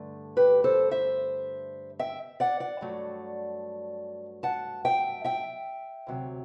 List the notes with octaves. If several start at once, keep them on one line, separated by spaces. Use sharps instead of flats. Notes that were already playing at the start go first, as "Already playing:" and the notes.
Already playing: G2 D3 A3
G4 B4
A4 C5
C5 E5
E5 G5
D5 F#5
D5 F#5
G2 F#3 A3
F#5 A5
E5 G5
E5 G5
D2 C3 F#3